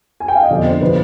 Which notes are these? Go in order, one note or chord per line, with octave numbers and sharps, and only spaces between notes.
G#5
G5
F5
D#5
F2 D3 F3 D5
C5
D3 F3 B4